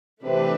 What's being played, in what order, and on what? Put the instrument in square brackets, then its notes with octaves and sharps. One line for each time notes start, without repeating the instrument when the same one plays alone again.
[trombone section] C3 [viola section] E3 A3 D4 G4 B4